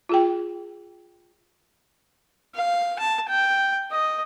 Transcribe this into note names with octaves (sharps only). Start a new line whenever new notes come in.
F4 G#4 G5
F5
A5
G5
D#5